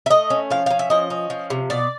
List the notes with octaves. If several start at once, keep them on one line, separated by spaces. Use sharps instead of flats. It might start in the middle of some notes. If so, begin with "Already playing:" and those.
E5
A3 D#5
C#4
F3 F5
C#4 F5
E5
F3 D#5
C#4
F3
C3
B2 D5